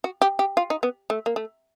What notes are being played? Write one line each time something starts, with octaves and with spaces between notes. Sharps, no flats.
F#4
G4
G4
F4
D#4
B3
A3
A#3
A3